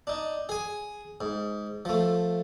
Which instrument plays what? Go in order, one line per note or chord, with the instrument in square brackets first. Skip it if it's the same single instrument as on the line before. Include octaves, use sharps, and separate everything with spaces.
[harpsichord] D4 D#4
G#4 G#5
G#2
F3 A3